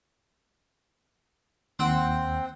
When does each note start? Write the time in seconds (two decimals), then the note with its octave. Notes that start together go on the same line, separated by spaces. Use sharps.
1.79 D#2 C4 F#5 G5 C6